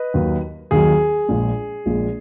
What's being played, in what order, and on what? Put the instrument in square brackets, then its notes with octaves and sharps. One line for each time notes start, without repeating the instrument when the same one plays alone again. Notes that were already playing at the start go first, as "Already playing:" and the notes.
Already playing: [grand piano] B4 D#5
D#2 D#3 F#3
D#2 D#3 F#3 G#4
A#1 A#2 G#3
A#1 A#2 G#3